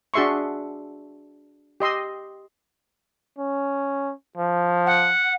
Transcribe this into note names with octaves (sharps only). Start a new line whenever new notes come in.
D4 F#4 G#4 E5 C6 C#6
G4 D#5 C6 E6
C#4
F3
F#5